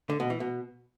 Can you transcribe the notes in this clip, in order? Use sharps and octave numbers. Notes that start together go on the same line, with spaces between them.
D3
B2
E3
B2